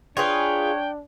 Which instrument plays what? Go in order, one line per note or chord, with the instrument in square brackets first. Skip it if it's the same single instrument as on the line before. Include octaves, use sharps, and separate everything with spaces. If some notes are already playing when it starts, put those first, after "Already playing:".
[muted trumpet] D4 [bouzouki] F4 G#4 B4 [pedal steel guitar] C#5 [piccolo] G5